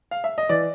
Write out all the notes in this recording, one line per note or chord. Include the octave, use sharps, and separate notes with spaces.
F5
E5
D#5
E3 D5